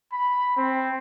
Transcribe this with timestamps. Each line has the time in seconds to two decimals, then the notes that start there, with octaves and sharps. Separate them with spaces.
0.12 B5
0.57 C4